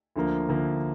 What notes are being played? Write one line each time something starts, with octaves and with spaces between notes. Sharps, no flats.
D2 D3 F3 A#3
D2 D3 F3 A#3